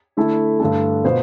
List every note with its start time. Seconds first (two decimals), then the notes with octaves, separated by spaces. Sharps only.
0.17 D3 A3 E4 A4
0.60 G2 D3 A3 D4 A4
1.04 B2 B3 F4 C5